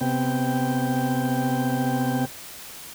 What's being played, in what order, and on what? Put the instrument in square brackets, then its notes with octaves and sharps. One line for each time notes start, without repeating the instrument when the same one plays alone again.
[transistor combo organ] C3 B3 G5